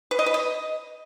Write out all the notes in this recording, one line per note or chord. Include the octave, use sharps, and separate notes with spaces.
B4
D#5
B4
D#5